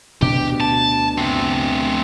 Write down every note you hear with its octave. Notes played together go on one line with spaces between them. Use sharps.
D2 B2 D4 G4
A5
A3 C4